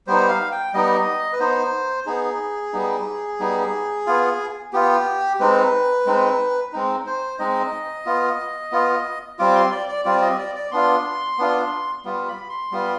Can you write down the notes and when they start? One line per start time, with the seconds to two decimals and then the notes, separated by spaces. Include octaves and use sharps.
0.07 G3 B3 D#4 C5
0.29 F5
0.51 G5
0.74 G3 B3 D#4 D#5
1.33 B4
1.40 B3 D#4 C5
2.06 B3 D#4 G#4
2.73 G3 B3 D#4
3.40 G3 B3 D#4
4.07 B3 F4
4.73 B3 F4 G4
5.40 G#3 C4 D#4 B4
6.06 G#3 C4 D#4
6.72 G#3 C4 D#4
7.07 C5
7.39 G#3 C4 D#4 D#5
8.06 B3 F4
8.72 B3 F4
9.39 G3 C4 F4 D6
9.55 C6
9.72 D5
9.89 D5
10.05 G3 C4 F4 D5
10.22 D#5
10.39 D5
10.55 D5
10.71 B3 D4 F4 C6
11.39 B3 D4 F4
12.05 G3 B3 F4
12.28 B5
12.49 C6
12.72 G3 B3 F4